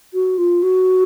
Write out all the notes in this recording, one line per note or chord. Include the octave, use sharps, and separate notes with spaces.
F#4
F4
F#4